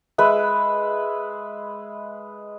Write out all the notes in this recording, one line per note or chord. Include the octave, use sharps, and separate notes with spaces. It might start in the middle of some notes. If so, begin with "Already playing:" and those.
G#3 B4 E5